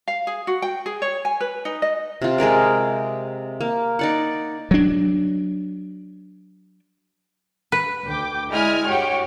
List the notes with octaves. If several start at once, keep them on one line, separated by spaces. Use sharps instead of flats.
F5
G#4
F#4
G5
G#4
C#5
G#5
B4
D#4
D#5
C3 F4
G#3 G#4 A#4 D5
A#3
D#4 D5 F#5
F#3 D4
B4
D2 G5 D6
G#3 E4 D5 D#5 G#5 F6
G2 F#4 G4 C#5 G5